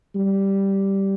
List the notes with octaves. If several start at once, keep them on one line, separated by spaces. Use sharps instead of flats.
G3